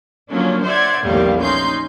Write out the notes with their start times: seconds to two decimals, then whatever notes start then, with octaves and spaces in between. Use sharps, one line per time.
0.29 D3 F3 F#3 A#3 C#4 D4
0.62 C5 D5 E5 F#5 G#6
1.03 A#1 E2 A2 D#3 G3 F5
1.39 C#4 D#4 C6 G6